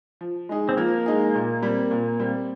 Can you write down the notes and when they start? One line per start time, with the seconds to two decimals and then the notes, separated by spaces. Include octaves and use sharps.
0.21 F3
0.49 G#3 D#4 G#4
0.69 C4
0.77 F3 A#3
1.06 G#3 D#4 G#4
1.35 A#2
1.63 G3 C4
1.91 A#2
2.20 G3 C4